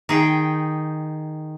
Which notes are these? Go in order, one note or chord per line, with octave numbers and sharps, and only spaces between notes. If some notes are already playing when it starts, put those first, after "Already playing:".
D#3 G#4 G5